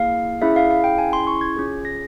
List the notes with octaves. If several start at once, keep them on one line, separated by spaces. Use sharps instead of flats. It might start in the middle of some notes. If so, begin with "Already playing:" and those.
Already playing: A#3 E4 G#4 F5
C#4 E4 G#4 E5
F5
F5
G5
G#5
C6
C#6
G#6
C#4 F4 G#4
A#6